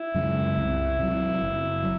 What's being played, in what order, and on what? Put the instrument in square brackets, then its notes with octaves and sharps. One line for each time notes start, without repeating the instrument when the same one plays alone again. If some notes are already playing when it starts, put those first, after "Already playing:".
Already playing: [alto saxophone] E4
[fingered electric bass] F#2 C#3 G#3
C2
C3 F#3
F#1
F#3